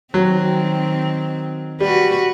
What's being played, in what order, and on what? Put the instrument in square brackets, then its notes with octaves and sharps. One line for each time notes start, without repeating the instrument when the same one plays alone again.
[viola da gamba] D#3 C4 [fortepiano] F#3
[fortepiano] G3 [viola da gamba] F#4 B4